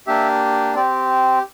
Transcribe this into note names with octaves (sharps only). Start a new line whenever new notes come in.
A#3 D4 G4 E5
C4 G4 D5